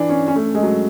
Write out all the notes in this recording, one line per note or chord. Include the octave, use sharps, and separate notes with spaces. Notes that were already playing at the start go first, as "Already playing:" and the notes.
Already playing: E3 D4
C#4
C#4
A3
G#3
F#3